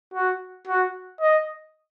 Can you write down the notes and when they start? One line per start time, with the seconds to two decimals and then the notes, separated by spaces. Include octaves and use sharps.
0.14 F#4
0.68 F#4
1.21 D#5